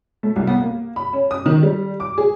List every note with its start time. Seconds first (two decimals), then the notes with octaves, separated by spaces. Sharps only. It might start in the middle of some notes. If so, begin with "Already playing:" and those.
0.23 A3
0.36 C2
0.47 B3
0.61 A#3
0.96 B5
1.13 C#4
1.31 D#6
1.46 D#3
1.63 G3
2.00 D6
2.18 G#4